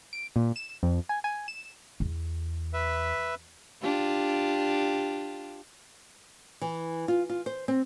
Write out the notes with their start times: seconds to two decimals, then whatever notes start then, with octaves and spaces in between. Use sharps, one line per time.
0.13 D7
0.36 A#2
0.56 E7
0.83 F2
1.09 G#5
1.24 G#5
1.48 E7
2.00 E2
2.74 B4 E5
3.82 D4 F4 G4
6.61 E3
7.08 F4
7.30 F4
7.46 C5
7.68 C4